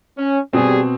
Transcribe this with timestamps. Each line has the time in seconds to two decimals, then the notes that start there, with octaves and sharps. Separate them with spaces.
0.17 C#4
0.53 B2 G3 C4 G4 G#4